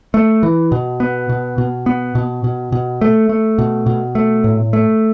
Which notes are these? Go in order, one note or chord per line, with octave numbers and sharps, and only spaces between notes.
A3
E3
B2
B3
B2
B2
B3
B2
B2
B2
A3
A3
B2
B2
A3
A2
A3